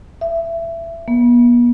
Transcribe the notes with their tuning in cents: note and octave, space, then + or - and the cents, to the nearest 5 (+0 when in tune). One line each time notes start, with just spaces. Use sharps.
E5 +20
B3 -45